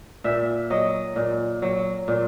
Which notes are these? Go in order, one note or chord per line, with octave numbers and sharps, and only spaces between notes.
A#2 E5
F#3 D#5
A#2
F#3
A#2